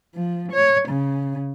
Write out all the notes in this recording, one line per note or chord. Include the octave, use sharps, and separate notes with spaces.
F3
C#5
C#3